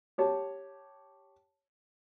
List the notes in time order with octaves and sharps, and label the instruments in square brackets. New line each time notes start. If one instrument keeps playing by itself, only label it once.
[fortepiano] G4 C#5 A5